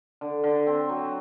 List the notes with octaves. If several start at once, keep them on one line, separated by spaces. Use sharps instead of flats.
D3
D3
C4
F#3